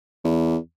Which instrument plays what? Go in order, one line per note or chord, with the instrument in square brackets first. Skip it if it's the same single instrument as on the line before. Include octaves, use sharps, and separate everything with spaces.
[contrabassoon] E2